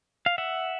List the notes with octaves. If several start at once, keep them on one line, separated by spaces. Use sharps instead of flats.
F5
E5 F#5